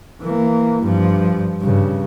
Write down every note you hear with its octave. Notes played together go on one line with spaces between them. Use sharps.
E3 A#3
G2 F3
G2 C#3